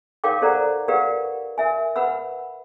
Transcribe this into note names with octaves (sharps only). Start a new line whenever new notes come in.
D#4 A#4 C#5 F5 G5 D6
G4 A4 C5 D5 F#5 A#5
G4 A#4 B4 D5 F5 F#5
A#4 E5 G#5
B4 F#5 B5 E6